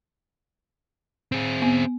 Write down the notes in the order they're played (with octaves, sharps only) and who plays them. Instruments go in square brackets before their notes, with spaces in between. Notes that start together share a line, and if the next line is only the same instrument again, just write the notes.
[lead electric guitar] C4 G#4
[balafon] B3